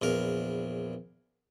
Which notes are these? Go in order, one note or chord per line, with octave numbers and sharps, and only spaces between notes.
A#1 E2 A#4